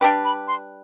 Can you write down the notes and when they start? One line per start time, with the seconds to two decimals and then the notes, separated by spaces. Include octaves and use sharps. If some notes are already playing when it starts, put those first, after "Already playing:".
0.01 G3 D4 G4 B4 G5
0.24 B5
0.48 C6